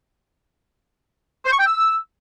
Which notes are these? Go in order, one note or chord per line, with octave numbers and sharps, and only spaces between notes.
C5
C#6
G5
E6